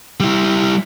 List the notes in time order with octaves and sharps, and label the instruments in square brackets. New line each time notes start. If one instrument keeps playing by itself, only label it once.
[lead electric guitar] G3 E4